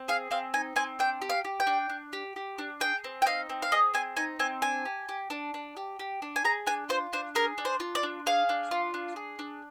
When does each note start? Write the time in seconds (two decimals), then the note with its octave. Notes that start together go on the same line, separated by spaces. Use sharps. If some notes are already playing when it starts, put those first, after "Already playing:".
Already playing: C4
0.08 G#4 F5
0.31 C4 F5
0.54 D#4 G#5
0.76 C4 G#5
0.99 D4 G5
1.22 G4
1.30 F5
1.45 G4
1.60 G5
1.67 D4
1.90 D4
2.13 G4
2.36 G4
2.58 D4
2.80 G#4 G5
3.04 C4
3.22 G5
3.26 D#4 F5
3.49 C4
3.62 F5
3.72 G#4 D#5
3.94 C4 G#5
4.17 D#4 G#5
4.39 C4 G#5
4.62 D4 G#5
4.85 G4
5.09 G4
5.30 D4
5.54 D4
5.77 G4
5.99 G4
6.22 D4
6.36 G#5
6.44 G#4 A#5
6.67 D4 G#5
6.89 F4 C5
7.13 D4 C5
7.35 G#4 A#4
7.58 D4
7.65 C5
7.80 F4
7.95 D5
8.03 D4
8.26 G#4 F5
8.49 D4
8.71 F4
8.94 D4
9.16 G#4
9.39 D4